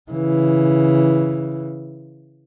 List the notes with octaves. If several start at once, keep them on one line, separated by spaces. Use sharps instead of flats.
C#3 E3